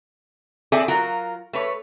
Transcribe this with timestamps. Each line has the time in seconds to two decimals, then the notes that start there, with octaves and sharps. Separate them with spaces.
0.72 C4 G#4 A4 D5 E5 G#5
0.88 F#3 F4 F#4 A#4
1.53 A3 B4 C#5